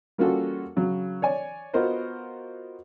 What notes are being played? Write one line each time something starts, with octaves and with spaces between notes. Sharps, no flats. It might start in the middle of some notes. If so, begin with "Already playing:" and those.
G3 A#3 C#4 F4 F#4 A4
C#3 F#3
C#5 D5 G#5
B3 F4 F#4 A#4 C5 D#5